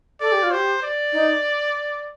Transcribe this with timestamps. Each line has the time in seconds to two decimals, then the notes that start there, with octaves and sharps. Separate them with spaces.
0.20 A4 D5
0.32 G4
0.43 F4
0.51 G4 C5
0.83 D5
1.13 D#4